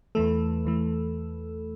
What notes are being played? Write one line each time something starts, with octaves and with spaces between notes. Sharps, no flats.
E2 E3 A3 A4
E2 E3 A3